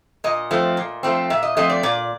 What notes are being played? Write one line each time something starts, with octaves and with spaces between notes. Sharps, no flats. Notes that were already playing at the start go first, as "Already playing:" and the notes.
A#2 D#5
F3 A3 C4
A#2
F3 A3 C4
A#2 E5
D#5
F3 A3 C4 D#5
D5
A#2 D5